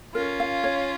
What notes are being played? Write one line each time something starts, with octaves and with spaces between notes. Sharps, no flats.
C#4 F4 A#4
F5
C#5